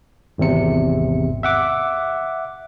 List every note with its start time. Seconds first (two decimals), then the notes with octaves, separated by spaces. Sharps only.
0.38 G#1 E2 C3 C#7
1.43 E5 F#5 D6